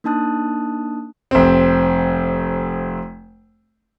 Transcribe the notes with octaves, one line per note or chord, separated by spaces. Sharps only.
A#3 D4 D#4 A5 D#6 F#6
F1 C4